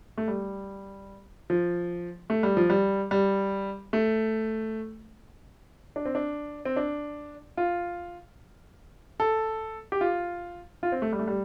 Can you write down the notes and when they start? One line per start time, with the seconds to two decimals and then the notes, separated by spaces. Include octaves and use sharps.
0.18 A3
0.28 G3
1.50 F3
2.30 A3
2.43 G3
2.57 F3
2.70 G3
3.11 G3
3.93 A3
5.96 D4
6.06 C4
6.15 D4
6.65 C4
6.76 D4
7.57 F4
9.20 A4
9.92 G4
10.01 F4
10.83 F4
10.92 C4
11.02 A3
11.13 G3
11.19 A3
11.28 G3